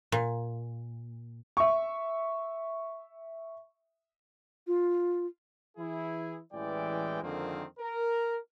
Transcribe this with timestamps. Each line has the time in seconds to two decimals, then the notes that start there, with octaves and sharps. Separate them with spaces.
0.12 A#2
1.57 E5 C#6
4.67 F4
5.78 E3 E4 G#4
6.53 A1 E3 G#3 D5 G5
7.23 F2 D3 D#3 G#3 A#3 C4
7.80 A#4